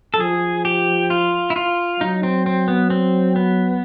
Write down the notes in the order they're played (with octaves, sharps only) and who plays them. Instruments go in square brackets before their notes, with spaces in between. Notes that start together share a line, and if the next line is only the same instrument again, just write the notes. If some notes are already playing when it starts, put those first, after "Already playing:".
[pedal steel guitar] A4
[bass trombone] F3 [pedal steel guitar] G#4
[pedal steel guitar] G4
F4
E4
F4
[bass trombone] F#3 [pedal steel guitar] D#4
[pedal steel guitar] C4
C4
B3
C4
B3